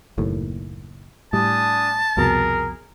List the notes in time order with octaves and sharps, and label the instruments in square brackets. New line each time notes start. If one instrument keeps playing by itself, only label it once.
[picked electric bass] F#1 D#2 A2
[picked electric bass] A2 G3 [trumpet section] D4 G#5 D#6 [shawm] A5
[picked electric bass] C2 F2 B2 [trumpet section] G#4 A#4